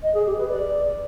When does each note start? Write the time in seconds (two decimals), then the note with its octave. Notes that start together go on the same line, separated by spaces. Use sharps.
0.03 D#5
0.14 G#4
0.26 G4
0.38 B4
0.49 D5